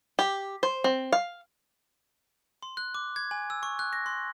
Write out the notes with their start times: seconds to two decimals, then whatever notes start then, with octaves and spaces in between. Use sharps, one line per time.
0.19 G4
0.63 C5
0.84 C4
1.12 F5
2.63 C6
2.77 F#6
2.94 D6
3.16 G#6
3.31 G#5
3.50 E6
3.63 C#6
3.79 F#6
3.93 A#6
4.06 C6